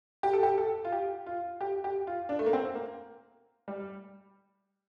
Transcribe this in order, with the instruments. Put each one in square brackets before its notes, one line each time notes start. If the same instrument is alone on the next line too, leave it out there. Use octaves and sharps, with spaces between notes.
[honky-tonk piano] G4
A4
G4
A4
F4
G4
F4
G4
G4
F4
D4
A3
A#3
C4
A#3
G3